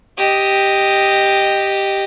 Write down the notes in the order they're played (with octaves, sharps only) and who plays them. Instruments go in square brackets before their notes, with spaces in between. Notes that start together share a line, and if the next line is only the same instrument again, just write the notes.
[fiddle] G4 D#5